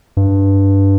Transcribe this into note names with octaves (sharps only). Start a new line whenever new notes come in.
G2